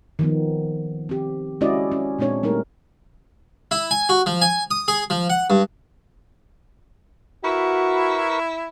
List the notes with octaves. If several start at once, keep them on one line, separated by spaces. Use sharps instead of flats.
D#3 F3 B3
C4 G4
G#3 C#4 E4 F#4 D5 D#5
C#4
A#2 G#3 C4 D4 C#5
G3 A3 A#3 D#4 A#4
E4
G#5
F#4
F3
G#5
D#6
G#4
F3
F#5
G2
E4 F#4 A#4 B4 C#6